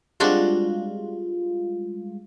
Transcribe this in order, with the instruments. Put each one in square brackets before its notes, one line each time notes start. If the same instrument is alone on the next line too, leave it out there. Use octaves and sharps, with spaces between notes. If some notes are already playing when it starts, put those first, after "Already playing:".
[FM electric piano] G3 G#3 F4 [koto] C4 D4 F#4